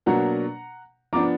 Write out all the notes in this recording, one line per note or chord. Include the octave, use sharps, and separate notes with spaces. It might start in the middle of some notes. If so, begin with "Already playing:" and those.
B2 F#3 A#3 D4 F#5 A#5
F3 B3 D4 A#5 D6